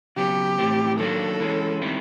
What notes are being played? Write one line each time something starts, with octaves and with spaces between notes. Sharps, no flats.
C#3 F#3 B3 G4
A2 E3 A3 C4
D#3 F#3 A#3 D4 A4
E3 G#3 C#4
D#3 G3 C4 E4